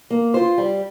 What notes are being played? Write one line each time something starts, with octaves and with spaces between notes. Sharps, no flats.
A#3
F4 C5
G3